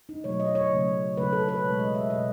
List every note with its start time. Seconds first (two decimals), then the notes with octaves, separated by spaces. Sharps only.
0.09 D#4
0.24 B2 F#3 A3 C#5
0.40 D#5
0.55 C#5
0.71 C#3 F#3 A3
1.17 C#3 F#3 A3 B4
1.33 A4
1.49 B4
1.64 B2 G#3 C#5
1.79 D#5
1.95 E5
2.10 B2 G#3 D#5